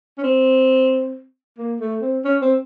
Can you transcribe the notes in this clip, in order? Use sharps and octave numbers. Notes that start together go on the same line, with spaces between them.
C#4
C4
A#3
A3
C4
C#4
C4